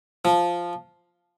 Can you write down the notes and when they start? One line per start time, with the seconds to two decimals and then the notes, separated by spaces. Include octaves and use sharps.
0.25 F3